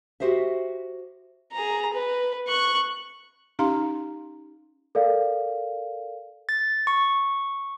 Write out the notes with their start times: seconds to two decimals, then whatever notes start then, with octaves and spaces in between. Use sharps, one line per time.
0.20 F#4 G4 C5 D#5 E5
1.53 G#4 A#5
1.93 B4
2.48 C#6 F#6
3.59 C#4 D#4 G4 F5 A#5 C6
4.95 A4 A#4 D5 F5
6.49 A6
6.87 C#6